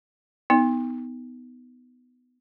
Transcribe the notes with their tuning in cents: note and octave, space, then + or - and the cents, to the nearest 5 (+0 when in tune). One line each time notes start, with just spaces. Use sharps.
B3 +15 D#4 +15